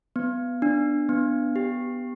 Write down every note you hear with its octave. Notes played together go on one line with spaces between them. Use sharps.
B3
D4
B3
G4